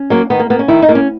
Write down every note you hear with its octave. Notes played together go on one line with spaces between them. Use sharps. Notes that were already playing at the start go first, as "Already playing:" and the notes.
Already playing: C#4
F#3 A#3
D#3 B3
A#3
A#3 B3
C#4
D#3 E4
D#4
A#3
C#4